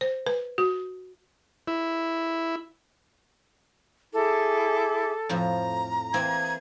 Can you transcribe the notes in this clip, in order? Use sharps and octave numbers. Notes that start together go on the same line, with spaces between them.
C5
B4
F#4
E4
E4 G#4 A4 D6
F2 A2 F3 A#5
E3 A#3 C4 G#6